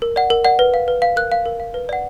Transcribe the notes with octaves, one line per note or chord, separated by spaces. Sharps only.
A#4
D5 F#5
A#4
D5 F#5
B4
F5
B4
F5
A#4 F#6
F5
A#4
F5
B4
D5 F#5